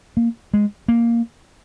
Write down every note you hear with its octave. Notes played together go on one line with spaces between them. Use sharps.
A#3
G#3
A#3